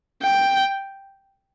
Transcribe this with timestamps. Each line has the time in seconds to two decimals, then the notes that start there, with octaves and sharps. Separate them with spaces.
0.23 G5